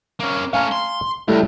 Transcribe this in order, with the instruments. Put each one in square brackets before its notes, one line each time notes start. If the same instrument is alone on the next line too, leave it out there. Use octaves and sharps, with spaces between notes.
[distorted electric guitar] A#3 C#4
[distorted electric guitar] A3 C#4 [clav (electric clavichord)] F5 G#5 A#5
[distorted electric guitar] C6
[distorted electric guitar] C#2 [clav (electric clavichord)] G3 A3 E4